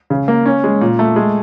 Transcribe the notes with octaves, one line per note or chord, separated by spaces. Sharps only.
C#3
A#3
C#4
G#3
A#2
A3
G#3